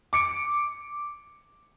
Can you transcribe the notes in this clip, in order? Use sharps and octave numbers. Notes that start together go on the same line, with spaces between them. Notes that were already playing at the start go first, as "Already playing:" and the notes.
D6 C#7 D7